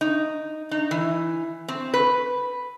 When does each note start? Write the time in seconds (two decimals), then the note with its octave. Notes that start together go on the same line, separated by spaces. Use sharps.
0.01 D#4
0.71 D#4
0.91 E3
1.68 C4
1.94 B4